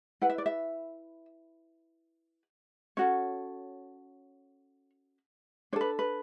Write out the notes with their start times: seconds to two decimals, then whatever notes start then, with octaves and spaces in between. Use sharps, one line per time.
0.22 E4 B4 F#5
0.30 E5
0.38 D5
0.46 E5
2.97 C#4 F#4 A4 C#5
5.73 D4 C#5
5.76 A4 B4
5.99 B4